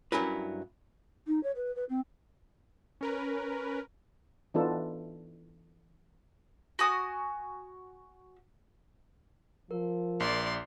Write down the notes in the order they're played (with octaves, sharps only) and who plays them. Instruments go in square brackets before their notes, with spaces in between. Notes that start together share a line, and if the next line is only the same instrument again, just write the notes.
[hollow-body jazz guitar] G2 F#3 C#4 E4 A#4 B4
[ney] D#4
C#5
B4
B4
C4
[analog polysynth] C#4 A#4 B4
[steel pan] E3 B3 D4 D#4 F4 A4
[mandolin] F#4 G#5 D#6
[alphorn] F3 [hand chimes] A#4
[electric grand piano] A#1 [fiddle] D5 C6